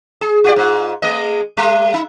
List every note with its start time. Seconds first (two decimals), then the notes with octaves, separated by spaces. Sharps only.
0.21 G#4
0.44 F4 G4 D5
0.56 G#2 F4
1.02 G#3 A3 D#5
1.57 G3 A3
1.94 D#4